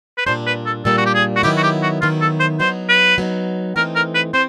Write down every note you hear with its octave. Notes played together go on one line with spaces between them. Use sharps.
B4
A#2 G3 A#3 D4 C5
B4
A4
A#2 G3 A#3 D4 A4
F#4
G4
G#4
F#4
D#3 F#3 B3 E4 G4
F#4
G4
F#4
D#3 F#3 B3 E4 F4
A4
C5
F#3 B3 D#4 C5
B4
F#3 B3 D#4
E3 A3 C4 D#4 A#4
A#4
B4
C4 C5